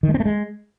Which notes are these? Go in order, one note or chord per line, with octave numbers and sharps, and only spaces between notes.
D#3
G#3
C4
A3
G#3